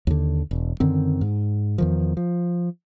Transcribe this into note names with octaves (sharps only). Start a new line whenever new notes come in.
D#2 D3
E1
F#2 D3 D#3 C4
G#2
E2 D#3 F3
F3